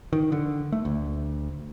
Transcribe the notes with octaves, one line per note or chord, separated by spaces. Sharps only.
D#3
D3
A3
D2